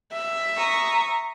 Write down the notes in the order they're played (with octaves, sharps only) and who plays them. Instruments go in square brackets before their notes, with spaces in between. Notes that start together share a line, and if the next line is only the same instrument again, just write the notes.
[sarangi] E5
[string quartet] A#5 C#6 D#6